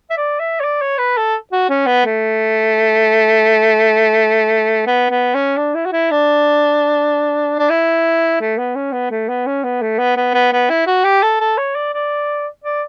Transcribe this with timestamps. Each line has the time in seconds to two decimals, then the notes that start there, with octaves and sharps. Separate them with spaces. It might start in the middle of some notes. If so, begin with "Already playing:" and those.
0.10 E5
0.17 D5
0.39 E5
0.60 C#5
0.64 D5
0.82 C#5
0.98 B4
1.17 A4
1.52 F#4
1.69 C#4
1.86 B3
2.05 A3
4.87 B3
5.10 B3
5.35 C#4
5.57 D4
5.75 E4
5.85 F#4
5.92 E4
6.11 D4
7.59 D4
7.70 E4
8.41 A3
8.58 B3
8.75 C#4
8.93 B3
9.11 A3
9.29 B3
9.47 C#4
9.64 B3
9.82 A3
9.98 B3
10.17 B3
10.34 B3
10.53 B3
10.70 E4
10.87 F#4
11.04 G4
11.23 A4
11.40 A4
11.57 C#5
11.75 D5
11.93 D5
12.64 D5